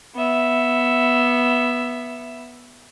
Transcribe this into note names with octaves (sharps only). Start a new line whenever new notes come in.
B3 E5